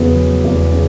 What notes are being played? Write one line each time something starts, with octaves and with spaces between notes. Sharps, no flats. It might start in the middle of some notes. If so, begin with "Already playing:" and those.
Already playing: E2 C#3 F#3 B3
F#3
E2
C#3